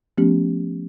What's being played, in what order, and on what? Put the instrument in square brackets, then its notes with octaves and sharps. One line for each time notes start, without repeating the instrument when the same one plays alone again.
[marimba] F3 A3 B3 C#4 G4